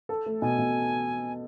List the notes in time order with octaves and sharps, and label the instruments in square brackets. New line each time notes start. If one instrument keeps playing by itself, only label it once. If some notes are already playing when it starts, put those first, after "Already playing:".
[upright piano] A4
A3
[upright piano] B2 [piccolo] G#5
[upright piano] B2